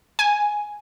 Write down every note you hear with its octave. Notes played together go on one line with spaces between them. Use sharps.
G#5